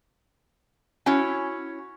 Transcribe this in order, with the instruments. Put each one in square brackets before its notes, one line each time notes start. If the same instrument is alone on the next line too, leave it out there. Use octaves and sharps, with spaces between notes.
[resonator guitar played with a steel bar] C#4 E4 F#4 C#5